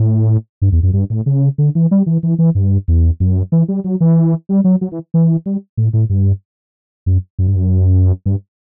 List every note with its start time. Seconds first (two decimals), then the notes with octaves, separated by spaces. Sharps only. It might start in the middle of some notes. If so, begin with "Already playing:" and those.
Already playing: A2
0.62 G2
0.72 E2
0.83 F#2
0.93 G2
1.10 A2
1.26 C#3
1.58 D3
1.75 E3
1.91 G3
2.06 E3
2.23 E3
2.39 E3
2.55 G2
2.88 E2
3.20 F#2
3.52 E3
3.68 G3
3.84 F#3
4.01 E3
4.49 G3
4.64 F#3
4.81 F#3
4.92 E3
5.14 E3
5.46 G3
5.77 A2
5.94 A2
6.10 G2
7.06 F#2
7.39 F#2
7.48 G2
7.56 F#2
8.26 G2